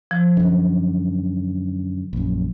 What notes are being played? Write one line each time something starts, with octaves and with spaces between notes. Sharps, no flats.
F3
F#2 D3
A#1 F#2